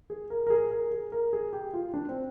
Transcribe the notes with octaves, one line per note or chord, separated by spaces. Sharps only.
G#4
A#4
A#4
G#4
A#4
G#4
A#4
G#4
G4
F4
D4
C4